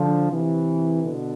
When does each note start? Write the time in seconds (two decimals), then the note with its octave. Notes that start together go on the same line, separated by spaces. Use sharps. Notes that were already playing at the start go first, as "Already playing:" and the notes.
Already playing: D3 F3
0.31 C3 E3
1.02 B2 D3